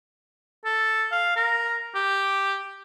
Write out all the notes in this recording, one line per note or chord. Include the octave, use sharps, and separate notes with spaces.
A4
F5
A#4
G4